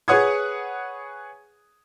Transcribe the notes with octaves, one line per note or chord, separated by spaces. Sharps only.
G#4 B4 C#5 F#5 D#6 G#6